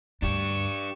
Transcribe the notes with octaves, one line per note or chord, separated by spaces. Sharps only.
D2 G2 D4 G4 C#6 E7